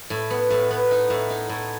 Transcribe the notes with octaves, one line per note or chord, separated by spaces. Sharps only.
A2
B3
A2
B3
D#4
A2
D#4
A2